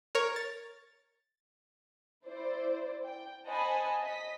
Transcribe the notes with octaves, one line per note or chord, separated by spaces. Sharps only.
A#4 C#5 A#5
A6
E4 C5 D5
G5
C5 D#5 F#5 G#5 A5 B5
D#5 B6